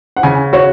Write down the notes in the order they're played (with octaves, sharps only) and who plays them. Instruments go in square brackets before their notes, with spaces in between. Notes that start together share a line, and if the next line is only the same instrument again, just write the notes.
[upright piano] F#5
[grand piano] C#3 [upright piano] G#5
[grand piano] F#4 [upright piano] C#5